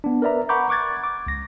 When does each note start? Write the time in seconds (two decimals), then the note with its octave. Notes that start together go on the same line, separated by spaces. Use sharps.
0.04 B3 D4
0.22 A#4 B4 D5 E5 A#5
0.49 F#5 A#5 B5 C#6 D6 G6
0.69 C#6 D6 F#6 G#6 A6
1.04 D6
1.27 C#2 A#6